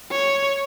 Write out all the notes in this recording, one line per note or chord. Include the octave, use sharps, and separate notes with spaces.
C#5